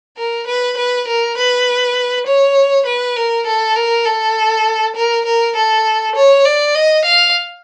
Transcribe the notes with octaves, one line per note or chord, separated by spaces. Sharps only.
A#4
B4
B4
A#4
B4
C#5
B4
A#4
A4
A#4
A4
A#4
A#4
A4
C#5
D5
D#5
F5